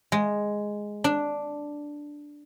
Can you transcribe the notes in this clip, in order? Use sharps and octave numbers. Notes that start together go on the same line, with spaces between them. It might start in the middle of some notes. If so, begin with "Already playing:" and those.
G#3
D4